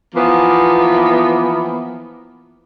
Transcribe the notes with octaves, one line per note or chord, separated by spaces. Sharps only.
E3 F3 A#3 B3